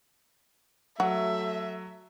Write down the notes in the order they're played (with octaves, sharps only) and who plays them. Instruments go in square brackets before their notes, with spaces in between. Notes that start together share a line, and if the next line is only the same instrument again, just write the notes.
[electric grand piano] F#3 [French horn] A3 [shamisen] F#4 [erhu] E5